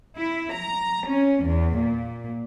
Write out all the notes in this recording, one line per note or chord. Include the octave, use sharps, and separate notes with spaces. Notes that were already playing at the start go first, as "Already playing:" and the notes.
E4
A#5
C#4
E2
A#2